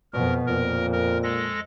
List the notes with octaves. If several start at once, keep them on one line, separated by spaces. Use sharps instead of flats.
F2 B2 A#4
F2 A#2 A#4
A#4
G#3 A4 A#6